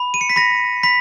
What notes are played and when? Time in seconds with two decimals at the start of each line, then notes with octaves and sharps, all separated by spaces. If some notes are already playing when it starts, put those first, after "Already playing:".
Already playing: B5
0.14 D#7
0.21 C#7
0.29 B6
0.36 B5 A#6
0.83 B5 B6